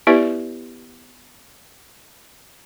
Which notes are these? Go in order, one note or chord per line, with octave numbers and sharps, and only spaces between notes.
B3 E4 G4 B4 D5 E5